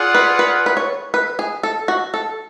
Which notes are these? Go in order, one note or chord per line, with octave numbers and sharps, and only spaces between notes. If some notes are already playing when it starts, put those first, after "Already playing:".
Already playing: F4 G#4 D5 F#5
B4
B4
B4
C#5
B4
G#4
A4
F#4
A4